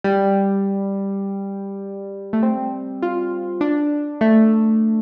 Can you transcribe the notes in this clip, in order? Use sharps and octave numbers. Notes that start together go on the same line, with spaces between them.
G3
A3
C4
F4
D4
A3